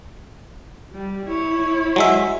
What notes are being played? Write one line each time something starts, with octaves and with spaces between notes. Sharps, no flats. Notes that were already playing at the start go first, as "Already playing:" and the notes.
G3
E4 C#5
F#3 G#3 E5